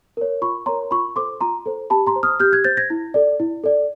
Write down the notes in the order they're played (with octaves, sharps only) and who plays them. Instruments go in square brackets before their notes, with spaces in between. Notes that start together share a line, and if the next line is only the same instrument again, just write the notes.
[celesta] A#4 C#5
F4 B5 C#6
A#4 C#5 A#5 C6
F4 B5 C#6
A4 C5 C6 D6
F4 A#5 C6
A4 C5
G4 A5 B5
A#5 C6
C5
D#6 F6
G4 F6 G6
F#6 G#6
C5 G6 A6
G#6 A#6
E4
A4 D5
E4
A4 D5